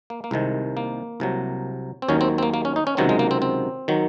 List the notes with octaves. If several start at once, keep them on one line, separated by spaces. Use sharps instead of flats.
A#3
A#3
C2 C3 D#3 G#3
A#3
C2 C3 F#3
C4
D#2 D#3 F#3 C#4
C4
C4
A#3
A#3
C#4
D#4
C#4
C#2 C3 D#3 F#3 C4
G#3
A#3
C4
C4
D#3 F#3